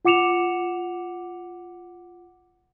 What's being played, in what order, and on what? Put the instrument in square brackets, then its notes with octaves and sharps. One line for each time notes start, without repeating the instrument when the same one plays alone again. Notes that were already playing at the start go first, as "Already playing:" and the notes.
[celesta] F4 F#5 D6 C#7 E7 F7